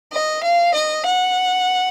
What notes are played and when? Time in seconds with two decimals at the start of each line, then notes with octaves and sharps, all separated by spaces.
0.12 D#5
0.44 F5
0.75 D#5
1.06 F#5